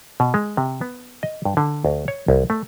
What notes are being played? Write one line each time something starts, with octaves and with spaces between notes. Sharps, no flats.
B2
G#3
C3
B3
D#5
G2
D3
D2
C#5
C2
A3